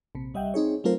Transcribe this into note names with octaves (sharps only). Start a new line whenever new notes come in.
A#1 C3
C2 G3 D#5 E5 F#5 G5
C4 D#4 G#4 C#5
F#3 A3 C4 F4 A#4 C5